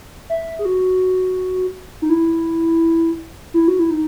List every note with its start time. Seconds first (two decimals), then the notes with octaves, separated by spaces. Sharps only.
0.30 E5
0.59 G#4
0.65 F#4
2.02 D#4
2.10 E4
3.54 E4
3.68 F#4
3.79 E4
3.91 D#4